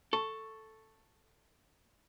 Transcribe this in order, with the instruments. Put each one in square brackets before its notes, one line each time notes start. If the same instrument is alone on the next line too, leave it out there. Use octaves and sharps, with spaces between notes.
[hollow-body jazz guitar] A4 [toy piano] C#6